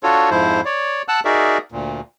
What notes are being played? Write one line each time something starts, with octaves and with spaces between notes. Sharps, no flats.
D4 F4 F#4 A4 C#5
F2 G#2 F3 E4 C5
C#5 D5
F#5 A5 E6 F#6
D#4 F#4 G#4 A#4 D5 E5
D2 A#2